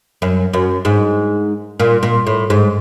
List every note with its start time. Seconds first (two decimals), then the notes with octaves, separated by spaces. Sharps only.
0.22 F#2
0.54 F#2
0.85 G#2
1.80 A#2
2.03 A#2
2.27 A2
2.50 G#2